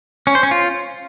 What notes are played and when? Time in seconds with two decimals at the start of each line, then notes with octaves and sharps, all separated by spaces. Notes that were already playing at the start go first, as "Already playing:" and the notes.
0.27 C#4
0.35 C5
0.43 C#4
0.51 F4